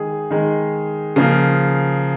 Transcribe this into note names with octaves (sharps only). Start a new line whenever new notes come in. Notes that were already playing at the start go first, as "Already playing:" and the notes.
Already playing: D#3 G#3 G#4
D#3 G#3
C#3 F3 A#3